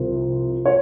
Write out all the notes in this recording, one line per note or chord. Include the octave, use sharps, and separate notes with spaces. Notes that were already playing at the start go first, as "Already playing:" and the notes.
Already playing: C2 C3 F3 C5
C#5